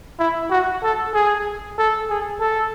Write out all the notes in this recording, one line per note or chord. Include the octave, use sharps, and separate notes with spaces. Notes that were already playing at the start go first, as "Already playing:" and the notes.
E4
F#4
A4
G#4
A4
G#4
A4